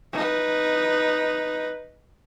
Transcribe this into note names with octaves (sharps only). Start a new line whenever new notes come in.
D#4 B4